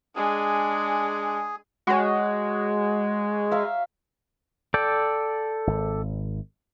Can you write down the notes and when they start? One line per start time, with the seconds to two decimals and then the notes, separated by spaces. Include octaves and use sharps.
0.16 G#3 D4 G#4
1.87 G#3 F#4 C#5
3.51 E5 F5 A#5
4.74 A4 D5 G5
5.67 G#1